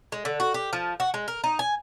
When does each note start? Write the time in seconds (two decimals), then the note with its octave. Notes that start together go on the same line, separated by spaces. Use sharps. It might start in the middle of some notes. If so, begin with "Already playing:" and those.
0.12 G#3
0.25 D3
0.40 F#4
0.54 G4
0.73 F3
1.00 F#4
1.14 G#3
1.28 A#4
1.44 D#4
1.59 G#5